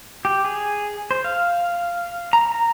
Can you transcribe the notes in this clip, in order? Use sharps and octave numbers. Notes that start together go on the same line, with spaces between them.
G4
G#4
C5
F5
A#5
A#5